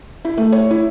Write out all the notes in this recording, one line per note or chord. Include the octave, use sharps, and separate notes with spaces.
E4
A3
C#5
E4